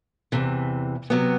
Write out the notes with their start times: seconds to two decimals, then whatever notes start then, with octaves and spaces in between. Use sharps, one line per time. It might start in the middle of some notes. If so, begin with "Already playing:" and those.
0.32 E2 C3 E3
1.10 C3 F#3 B3 F#4